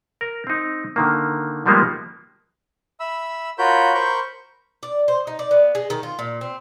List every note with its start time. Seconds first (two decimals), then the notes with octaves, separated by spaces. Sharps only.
0.21 A#4
0.47 C4 D#4
0.96 D3 D#3 A#3
1.66 D#3 F3 G3 G#3 A#3 B3
3.00 E5 B5 E6
3.58 F4 F#4 A#4 C#5 B5 G6
3.94 A#4 C5 B5 C#6 G6
4.83 D5
5.08 C5
5.27 D#4
5.39 D5
5.51 B3
5.75 G#3
5.90 D#3
6.03 F4
6.19 A#2
6.41 C4